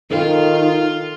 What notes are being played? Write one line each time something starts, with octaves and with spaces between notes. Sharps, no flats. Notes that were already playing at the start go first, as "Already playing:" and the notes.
D#3 D#4 F4 A4 G5